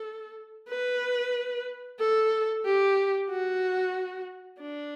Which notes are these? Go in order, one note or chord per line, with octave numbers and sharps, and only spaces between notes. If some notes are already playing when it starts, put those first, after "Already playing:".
Already playing: A4
B4
A4
G4
F#4
D4